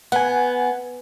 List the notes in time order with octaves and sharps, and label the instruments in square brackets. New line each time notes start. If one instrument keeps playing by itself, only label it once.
[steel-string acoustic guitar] B3 [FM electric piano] F#5 G#5